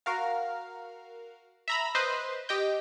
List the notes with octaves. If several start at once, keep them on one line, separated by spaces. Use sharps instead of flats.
F#4 A#4 F5
E5 A#5 B5
B4 C5 D#5
G4 D#5 G5